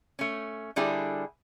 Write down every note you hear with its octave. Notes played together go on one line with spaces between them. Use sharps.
A3 C#4
D3 G3 D4 E4 G#4